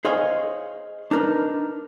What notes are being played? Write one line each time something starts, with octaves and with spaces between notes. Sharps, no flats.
G#4 C5 C#5 D#5 F5 G#5
D4 D#4 A#4 B4